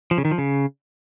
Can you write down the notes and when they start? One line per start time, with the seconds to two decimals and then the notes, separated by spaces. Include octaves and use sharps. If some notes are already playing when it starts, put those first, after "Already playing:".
0.11 F3
0.18 C#3
0.25 D#3
0.31 F3
0.38 C#3